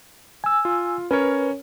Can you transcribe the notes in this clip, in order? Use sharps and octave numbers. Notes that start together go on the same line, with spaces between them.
G#5 E6
F4
C#4 A#4 B4 C#5